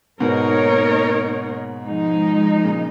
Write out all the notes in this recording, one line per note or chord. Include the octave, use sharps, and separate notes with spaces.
G#2 B2 A#3 D#4 A#4 C#5
F3 G#3 D#4
A#2 C#3